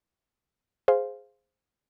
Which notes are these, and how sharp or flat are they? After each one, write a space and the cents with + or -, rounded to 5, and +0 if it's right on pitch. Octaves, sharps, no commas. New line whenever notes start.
G#4 +0 C5 +0 F5 +0